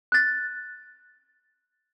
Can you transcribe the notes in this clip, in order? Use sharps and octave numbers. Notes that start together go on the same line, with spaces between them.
F#6 A6